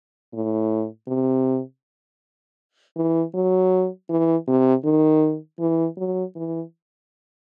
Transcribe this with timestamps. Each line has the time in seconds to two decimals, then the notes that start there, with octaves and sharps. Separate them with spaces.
0.34 A2
1.08 C3
2.97 E3
3.35 F#3
4.10 E3
4.48 C3
4.85 D#3
5.60 E3
5.97 F#3
6.36 E3